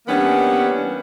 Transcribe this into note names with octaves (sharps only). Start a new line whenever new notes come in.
E3 G3 A#3 B3 C#4 D4